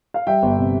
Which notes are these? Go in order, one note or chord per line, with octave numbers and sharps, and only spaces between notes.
F5
G3 E5 G5
G1
C3